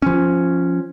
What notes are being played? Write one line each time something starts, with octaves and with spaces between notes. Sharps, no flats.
F3 C#4